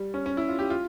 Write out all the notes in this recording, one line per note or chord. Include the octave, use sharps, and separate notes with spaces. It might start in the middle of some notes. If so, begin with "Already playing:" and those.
Already playing: G3
C#4
C#4
E4
F4
G4
F4